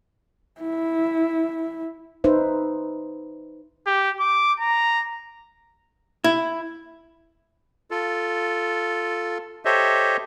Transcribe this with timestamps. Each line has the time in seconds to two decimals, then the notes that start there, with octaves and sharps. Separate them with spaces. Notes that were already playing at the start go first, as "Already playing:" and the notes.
0.61 E4
2.24 D#4 B4 C5 E5
3.86 G4
4.20 D6
4.60 A#5
6.24 E4
7.91 F4 A4
9.65 G4 A4 C5 C#5 D#5 E5